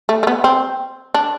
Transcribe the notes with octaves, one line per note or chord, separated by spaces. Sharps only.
A3
A3
B3
C4
D4